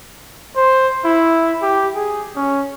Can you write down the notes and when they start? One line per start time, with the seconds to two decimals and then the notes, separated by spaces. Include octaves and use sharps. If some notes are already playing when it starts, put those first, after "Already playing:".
0.56 C5
1.05 E4
1.62 G4
1.96 G#4
2.36 C#4